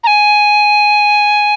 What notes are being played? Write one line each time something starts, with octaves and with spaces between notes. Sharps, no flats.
A#5
G#5